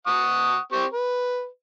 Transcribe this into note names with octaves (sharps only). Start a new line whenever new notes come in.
F#5 C#6 D#6
C4 G4 C#6
B4